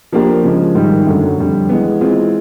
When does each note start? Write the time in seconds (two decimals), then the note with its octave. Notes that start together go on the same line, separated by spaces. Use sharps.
0.12 F3 A#3 D4 G4 A#4
0.43 C#3 F3 G#3
0.75 G#2 D#3 G3
1.06 F#2 D3 F#3 A3
1.38 F2 D3 G3
1.69 E3 G#3 B3
2.01 E3 G#3 C4 F4